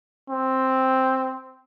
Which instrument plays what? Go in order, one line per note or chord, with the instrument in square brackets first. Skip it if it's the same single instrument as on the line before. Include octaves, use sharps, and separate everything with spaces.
[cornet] C4